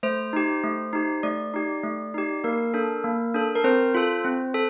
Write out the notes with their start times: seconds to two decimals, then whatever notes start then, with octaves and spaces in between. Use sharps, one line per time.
0.03 A3 C5
0.33 D#4 G4
0.63 A3
0.93 D#4 G4
1.23 A3 D5
1.54 D#4 G4
1.84 A3
2.14 D#4 G4
2.44 A#3 A#4
2.74 D4 A4
3.04 A#3
3.34 D4 A4
3.55 A#4
3.64 C4 C5
3.94 F4 A4
4.24 C4
4.54 A4